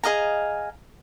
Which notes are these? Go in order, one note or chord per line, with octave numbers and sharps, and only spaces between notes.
G#4 D#5 F5 A#5